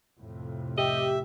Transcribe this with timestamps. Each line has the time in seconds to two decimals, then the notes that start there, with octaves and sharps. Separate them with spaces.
0.18 F2 A2 C3
0.78 G4 D#5 E5